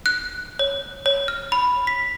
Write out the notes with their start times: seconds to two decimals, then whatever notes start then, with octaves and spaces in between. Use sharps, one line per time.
0.06 F#6
0.59 C#5
1.06 C#5
1.28 F6
1.52 B5
1.87 B6